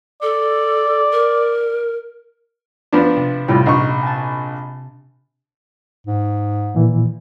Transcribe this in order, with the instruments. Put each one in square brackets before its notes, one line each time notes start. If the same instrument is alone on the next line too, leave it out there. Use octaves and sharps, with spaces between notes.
[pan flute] A4 [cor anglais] D5
[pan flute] A#4
[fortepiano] F3 B3 D4
[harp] C3
[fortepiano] A2 G3 F4 [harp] C3
[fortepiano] A#1 D#4 C#6
[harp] G#5 A5
[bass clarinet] G#2
[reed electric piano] A#2 E3